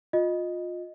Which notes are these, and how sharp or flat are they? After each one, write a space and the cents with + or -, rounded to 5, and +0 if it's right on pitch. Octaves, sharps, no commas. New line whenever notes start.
F4 +25 D#5 +0